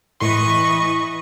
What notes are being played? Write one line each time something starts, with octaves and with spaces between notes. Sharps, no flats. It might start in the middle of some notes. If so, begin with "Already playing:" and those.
A2 E3 E4 B4 D#5 C6 C#6